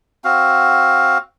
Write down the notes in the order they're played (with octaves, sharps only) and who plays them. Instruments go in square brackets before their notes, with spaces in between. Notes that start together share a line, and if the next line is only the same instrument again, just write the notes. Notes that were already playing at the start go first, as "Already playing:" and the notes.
[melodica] C4 F#4 F5